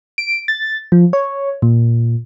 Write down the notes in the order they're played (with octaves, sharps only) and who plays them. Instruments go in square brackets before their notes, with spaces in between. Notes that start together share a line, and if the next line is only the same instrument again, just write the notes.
[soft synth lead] D7
A6
F3
C#5
A#2